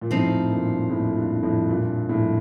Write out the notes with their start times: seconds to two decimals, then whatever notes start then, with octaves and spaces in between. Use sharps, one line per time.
0.01 A#2
0.10 F2 A2 F3 C4 D#4
0.50 G2 A#2
0.90 F2 A2
1.16 G2
1.43 F2 A2
1.69 G2 A#2
2.09 F2 A2